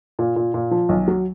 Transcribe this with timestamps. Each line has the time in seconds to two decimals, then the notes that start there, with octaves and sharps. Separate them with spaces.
0.19 A#2
0.36 A#2
0.54 A#2
0.71 F3
0.89 B1
1.08 F#3